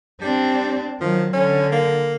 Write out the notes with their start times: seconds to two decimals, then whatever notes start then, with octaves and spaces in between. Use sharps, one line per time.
0.21 G3 C4 D4
1.01 D#3 F3 F#3
1.33 D3 C#4
1.72 A#3